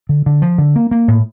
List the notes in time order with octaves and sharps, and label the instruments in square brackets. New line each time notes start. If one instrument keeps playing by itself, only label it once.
[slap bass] D3
D3
F3
D3
A#3
A#3
A2